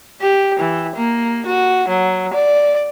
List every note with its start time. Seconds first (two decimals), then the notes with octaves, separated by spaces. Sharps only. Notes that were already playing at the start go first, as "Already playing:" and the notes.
0.21 G4
0.59 E3
0.96 A#3
1.46 F#4
1.88 F#3
2.33 D5